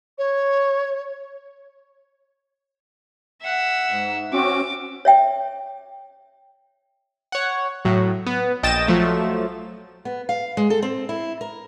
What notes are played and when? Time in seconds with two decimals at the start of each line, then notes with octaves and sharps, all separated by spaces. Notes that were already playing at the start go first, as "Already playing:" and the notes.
0.18 C#5
3.42 E5 F#5
3.90 G#2
4.33 C4 C#4 F#4 D6
5.05 C#5 E5 G5
7.32 C#5 F#5
7.85 A2 F#3
8.26 B3
8.63 A#1 D#5 G5 A6 E7
8.88 F3 F#3 A3
10.05 B3
10.29 F5
10.57 G#3
10.70 A4
10.82 C4
11.09 E4
11.41 A#4